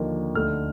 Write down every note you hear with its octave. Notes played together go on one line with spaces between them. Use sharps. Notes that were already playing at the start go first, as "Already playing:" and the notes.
Already playing: D#2 D3 F3 A#3 D#4
D2 D3 A3 D#4 F6